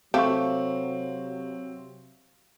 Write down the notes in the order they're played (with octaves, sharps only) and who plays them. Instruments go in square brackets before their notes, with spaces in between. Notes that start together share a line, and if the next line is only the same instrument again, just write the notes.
[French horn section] C3 F#3 [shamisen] A3 G4 [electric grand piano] C4 [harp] F5 C#6